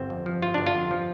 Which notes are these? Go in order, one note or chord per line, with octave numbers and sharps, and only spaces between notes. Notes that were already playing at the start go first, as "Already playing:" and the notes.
Already playing: G1 C4
F2
F3
G1 F4
G1 D4
F4
F2
F3